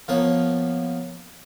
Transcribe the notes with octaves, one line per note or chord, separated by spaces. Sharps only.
F3 A#3 B3 C#5